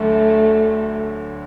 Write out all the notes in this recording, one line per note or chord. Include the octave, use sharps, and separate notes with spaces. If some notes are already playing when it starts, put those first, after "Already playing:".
Already playing: D2 D3 F#3 A3